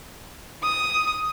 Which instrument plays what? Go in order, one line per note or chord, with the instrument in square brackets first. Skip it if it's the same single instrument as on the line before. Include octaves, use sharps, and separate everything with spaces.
[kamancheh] D#6